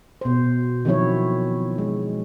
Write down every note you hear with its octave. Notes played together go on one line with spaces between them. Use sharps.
B2 C5
D#3 F3 F#3 C4 E4 C#5
G#3